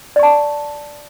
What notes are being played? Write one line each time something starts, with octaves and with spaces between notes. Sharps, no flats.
D5 A5 C#6